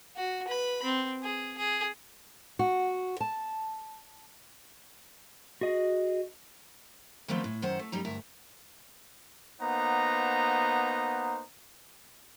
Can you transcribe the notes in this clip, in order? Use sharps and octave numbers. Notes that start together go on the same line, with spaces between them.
F#4
B4 B5
C4
G#4
G#4
F#4
A5
F#4 G#4 D#5
D#3 F3 G3 A3 B3 C4
A2
F#2 D#3 C5 F#5
A3
F#2 G3 D#4 A#5
D2 G2 A#4 E5
A#3 B3 D#4 C5 F#5 A#5